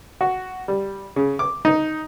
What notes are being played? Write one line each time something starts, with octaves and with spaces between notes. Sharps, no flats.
F#4
G3
C#3
D6
D#4